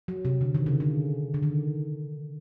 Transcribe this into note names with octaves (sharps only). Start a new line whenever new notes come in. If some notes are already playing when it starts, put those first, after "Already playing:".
F#3
C3
D3
D#3
C#3
D3
D3
D#3